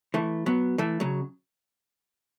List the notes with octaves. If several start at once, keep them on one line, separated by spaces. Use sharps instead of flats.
E3 A3
F#3 B3
E3 A3
C#3 F#3